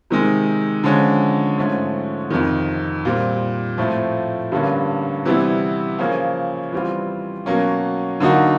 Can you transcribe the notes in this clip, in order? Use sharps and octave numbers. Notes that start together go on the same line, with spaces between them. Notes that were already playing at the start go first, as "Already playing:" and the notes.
C3 D#3 G#3
D3 F3 G#3 C#4
G#2 F3 A3 C#4
F2 C3 D#3
A#2 G3 C4
A2 F3 A3 C4
G2 D3 G3 A#3 C#4
C3 E3 G3 B3 E4
C#3 F3 A#3 C#4
E3 G3 C4 F4
B2 F#3 A#3 C#4
D3 F#3 A#3 D#4 F#4